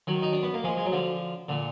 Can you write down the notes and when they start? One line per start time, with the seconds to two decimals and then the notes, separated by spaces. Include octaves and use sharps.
0.07 D#3 F#3
0.22 D#4
0.32 D4
0.43 B3
0.54 A#3
0.64 F3 G#3
0.77 G#3
0.86 F#3
0.92 D3 F3
1.49 A#2 D3